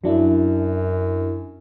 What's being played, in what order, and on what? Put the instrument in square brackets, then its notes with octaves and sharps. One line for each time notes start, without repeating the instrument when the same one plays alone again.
[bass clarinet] F#2 [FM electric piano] F#3 D4 E4